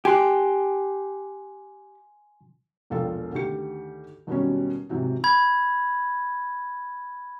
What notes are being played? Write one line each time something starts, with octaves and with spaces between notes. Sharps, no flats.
G4 G#5 C6 F#6
E1 A#1 F4 A4 G5
D2 D#3 G4 C#7
D#2 B2 F#3 G3 C#4
G#2 C3 E3 F#3
B5 G#6